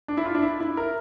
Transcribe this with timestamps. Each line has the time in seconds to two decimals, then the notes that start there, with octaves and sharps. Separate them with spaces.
0.08 D4
0.17 E4
0.25 F4
0.35 D4
0.43 E4
0.60 E4
0.77 A#4